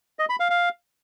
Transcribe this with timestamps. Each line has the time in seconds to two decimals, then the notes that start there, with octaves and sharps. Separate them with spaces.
0.19 D#5
0.30 B5
0.40 F5
0.50 F5